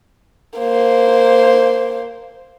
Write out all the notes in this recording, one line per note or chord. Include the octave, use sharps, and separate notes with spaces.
A#3 C5